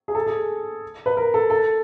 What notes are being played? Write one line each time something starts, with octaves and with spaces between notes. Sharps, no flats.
G#4
A4
G#4
B4
A#4
A4
A4